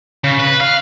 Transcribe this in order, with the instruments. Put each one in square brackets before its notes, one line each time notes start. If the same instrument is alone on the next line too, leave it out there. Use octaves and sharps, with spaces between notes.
[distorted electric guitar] C#3
B4
F5